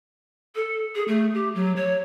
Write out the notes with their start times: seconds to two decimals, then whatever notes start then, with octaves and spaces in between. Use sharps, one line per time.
0.55 A4
0.95 G#4
1.08 A3
1.34 G4
1.55 F#3
1.76 C#5